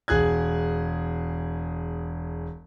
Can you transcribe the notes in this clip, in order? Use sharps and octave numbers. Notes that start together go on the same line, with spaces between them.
E1 G#4 F#6 G#6